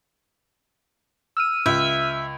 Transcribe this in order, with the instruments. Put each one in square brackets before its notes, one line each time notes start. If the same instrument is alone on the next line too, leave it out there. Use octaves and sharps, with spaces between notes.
[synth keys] E6 F6 D#7
[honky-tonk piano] C#2 [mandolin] E5